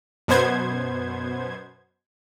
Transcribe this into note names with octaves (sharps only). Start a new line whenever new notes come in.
F#2 B2 B3 C5 G#6